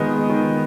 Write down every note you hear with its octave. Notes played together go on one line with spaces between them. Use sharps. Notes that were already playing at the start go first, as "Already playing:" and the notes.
Already playing: D#3 G#3 B3 D#5
D#3